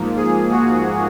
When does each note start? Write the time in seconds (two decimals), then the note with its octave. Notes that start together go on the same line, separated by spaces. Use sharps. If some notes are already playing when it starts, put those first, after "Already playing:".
Already playing: G#2 F3 A#3
0.17 G#4
0.51 F#4